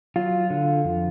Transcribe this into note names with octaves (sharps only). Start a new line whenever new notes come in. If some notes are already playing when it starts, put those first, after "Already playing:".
F#3 F4
D3
F2